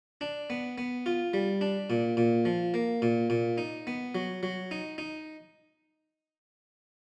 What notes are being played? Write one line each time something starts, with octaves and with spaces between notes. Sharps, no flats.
D4
B3
B3
F4
G3
D4
A#2
A#2
F3
A#3
A#2
A#2
D#4
B3
F#3
F#3
D#4
D#4